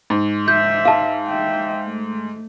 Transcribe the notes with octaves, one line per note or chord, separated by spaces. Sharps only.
G#2
E5 G6
F5 A5
E5 G5
A3